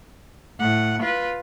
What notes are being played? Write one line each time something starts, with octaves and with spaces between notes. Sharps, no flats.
A2 F#5
F4 B4